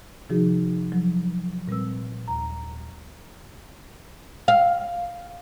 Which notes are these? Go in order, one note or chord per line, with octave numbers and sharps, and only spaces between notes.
C3 D#3 F3 D#4 F#4 G#4
F3 F#3
A#2 G3 C4 B4 E6
D#2 A#5
F5